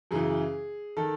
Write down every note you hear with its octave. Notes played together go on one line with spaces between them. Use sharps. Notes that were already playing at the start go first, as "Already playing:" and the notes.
F#2 C#3 E3 G#4
D#3 A4